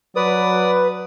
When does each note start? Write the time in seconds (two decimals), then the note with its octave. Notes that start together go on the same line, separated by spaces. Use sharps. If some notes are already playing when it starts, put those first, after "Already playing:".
0.16 F#3 B4 D5 D#6